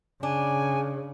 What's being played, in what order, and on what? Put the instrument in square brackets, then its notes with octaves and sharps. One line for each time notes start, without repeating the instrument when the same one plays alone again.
[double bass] C#3 [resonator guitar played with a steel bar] D4 [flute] G#5